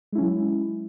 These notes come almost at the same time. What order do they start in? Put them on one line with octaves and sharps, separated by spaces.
G#3 E4 C#4 F#3